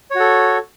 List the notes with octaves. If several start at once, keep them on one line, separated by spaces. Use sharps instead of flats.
F#4 A4 C#5